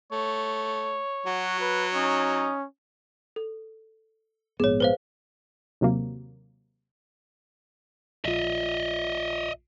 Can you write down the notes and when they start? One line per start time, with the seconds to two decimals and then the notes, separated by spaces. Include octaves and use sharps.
0.12 A3 C#5
1.26 F#3 F#4
1.60 B4
1.94 C#4 D#4
3.36 A4
4.60 A#1 G#2 B3 G#4 C#5
4.80 B4 C5 F5
5.81 D#2 C3 F#3 A#3
8.25 A#1 F4 D#5 E5